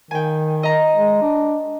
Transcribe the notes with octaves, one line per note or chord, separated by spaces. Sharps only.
D#3 G5 G#5
D#5 A#5
G#3
D4